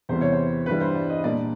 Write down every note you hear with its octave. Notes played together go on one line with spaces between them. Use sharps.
E2 C3 E3 G3 C5
C#5
C5
G2 E3 G3 B4
C5
D5
D#5
A#2 G3 A#3 D4 D5